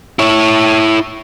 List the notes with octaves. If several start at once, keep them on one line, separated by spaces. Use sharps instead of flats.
E4 C#5